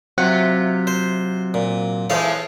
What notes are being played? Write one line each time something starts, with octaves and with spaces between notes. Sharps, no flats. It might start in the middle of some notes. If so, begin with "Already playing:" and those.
C3 F#3 C4 F4 F#5
C5
A#2
E3 F3 G#3 A4 C#5 F5